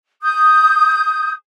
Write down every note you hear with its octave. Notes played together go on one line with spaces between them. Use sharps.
D#6 G6